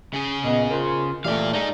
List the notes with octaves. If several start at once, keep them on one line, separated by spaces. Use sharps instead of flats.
C#3 G#4
A#2 B3 D#5
F4 A#4 C5
A#2 E3 A3 G4 D5 F5
G#3 D#4 D5